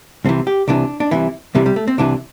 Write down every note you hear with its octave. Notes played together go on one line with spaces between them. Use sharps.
C2 C3 E3 C4
G4
C2 C3 E3 D4
D4
C2 C3 E3 E4
C2 C3 E3 G3
G3
A3
C4
C2 C3 E3 D4